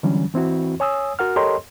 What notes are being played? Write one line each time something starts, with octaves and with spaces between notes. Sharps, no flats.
D3 E3 F#3 G3 C#4
E3 C4 E4 F#4
C#5 G#5 D#6 E6
F#4 A#4 F#5 F6
G4 A4 A#4 C#5 D#5 C6